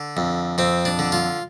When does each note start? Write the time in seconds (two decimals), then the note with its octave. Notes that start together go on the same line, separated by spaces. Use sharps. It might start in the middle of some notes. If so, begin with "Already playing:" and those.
Already playing: D3
0.17 F2
0.58 F2 C4
0.85 D4
0.99 D3
1.12 F4